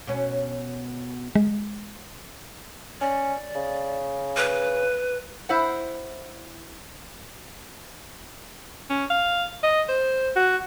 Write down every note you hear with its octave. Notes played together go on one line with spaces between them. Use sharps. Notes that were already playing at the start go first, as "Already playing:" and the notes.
B2 C#4
G#3
C#4 D5
C#3
B4
E4 C5 F#5
C#4
F5
D#5
C5
F#4